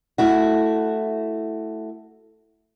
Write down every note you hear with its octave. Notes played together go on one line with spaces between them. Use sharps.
A3 E4 F#4